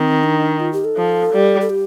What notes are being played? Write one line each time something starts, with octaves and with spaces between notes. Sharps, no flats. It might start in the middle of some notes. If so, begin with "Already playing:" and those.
Already playing: D#3 C4
D4
F4
G4
A4
F3
G3
A4
G4